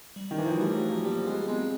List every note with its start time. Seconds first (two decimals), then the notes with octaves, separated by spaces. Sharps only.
0.16 G3
0.31 D#3
0.39 E3
0.46 F3
0.53 F#3
0.60 G3 A3
0.75 F#3
0.90 F3
1.04 G3 A#3
1.26 G#3 B3
1.48 G#3 C4